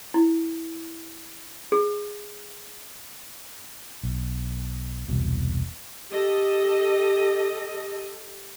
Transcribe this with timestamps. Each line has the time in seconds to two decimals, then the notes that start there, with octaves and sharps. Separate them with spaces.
0.14 E4
1.72 G#4
4.03 B1
5.08 E1 C2 B2
6.11 G4 A4 D#5